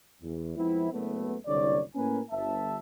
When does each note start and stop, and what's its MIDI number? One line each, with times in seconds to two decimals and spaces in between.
0.22 0.54 40
0.56 0.89 41
0.56 0.89 53
0.56 0.89 56
0.56 0.89 59
0.56 0.89 60
0.56 0.89 64
0.91 1.34 30
0.91 1.34 57
0.91 1.34 59
1.46 1.80 30
1.46 1.80 36
1.46 1.80 50
1.46 1.80 73
1.46 1.80 74
1.95 2.19 45
1.95 2.19 58
1.95 2.19 61
1.95 2.19 70
1.95 2.19 71
1.95 2.19 80
2.30 2.77 31
2.30 2.77 76
2.30 2.77 81